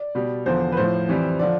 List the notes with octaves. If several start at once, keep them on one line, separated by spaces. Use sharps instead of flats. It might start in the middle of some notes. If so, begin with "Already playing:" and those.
Already playing: D5
B2 G3
E2 D3 F3 C5
B4
A2 F3 C5
F2 E3 G3
D3 F3 D5